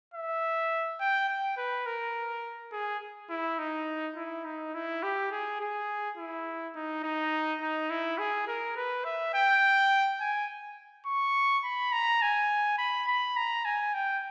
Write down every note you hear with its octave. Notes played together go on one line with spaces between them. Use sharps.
E5
G5
G5
B4
A#4
G#4
E4
D#4
E4
D#4
E4
G4
G#4
G#4
E4
D#4
D#4
D#4
E4
G#4
A#4
B4
E5
G5
G#5
C#6
B5
A#5
G#5
B5
B5
A#5
G#5
G5